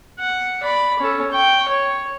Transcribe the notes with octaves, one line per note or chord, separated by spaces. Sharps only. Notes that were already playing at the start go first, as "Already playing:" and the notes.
F#5
D5 B5
C#4 A4
G5 C#6
C#5